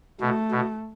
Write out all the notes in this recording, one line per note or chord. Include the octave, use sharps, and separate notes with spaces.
B2 A3
B2